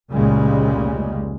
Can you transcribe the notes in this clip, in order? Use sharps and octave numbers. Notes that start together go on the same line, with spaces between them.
F1 C#2 A#2 C#3 G3 G#3